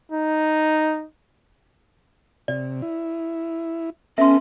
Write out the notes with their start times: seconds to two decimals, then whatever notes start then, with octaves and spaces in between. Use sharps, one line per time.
0.12 D#4
2.48 C3 D5
2.82 E4
4.18 B3 C#4 A4 E5 C6